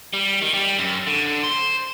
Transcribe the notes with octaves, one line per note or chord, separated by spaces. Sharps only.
G3
D#3
G3
F#2
D3
C5